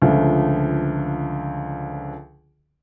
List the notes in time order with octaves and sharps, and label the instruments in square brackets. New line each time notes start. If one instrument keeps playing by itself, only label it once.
[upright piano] C#2 D3 F3 A3